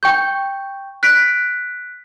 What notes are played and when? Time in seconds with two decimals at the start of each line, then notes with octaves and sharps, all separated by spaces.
0.03 G5 C#6 G6
1.03 F#6 B6 D7